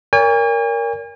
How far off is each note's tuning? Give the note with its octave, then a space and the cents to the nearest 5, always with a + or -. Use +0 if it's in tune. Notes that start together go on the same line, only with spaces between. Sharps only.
A#4 +0 C#5 +40 G#5 -40